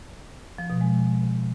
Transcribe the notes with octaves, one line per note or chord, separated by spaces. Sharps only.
F3
B2
G#3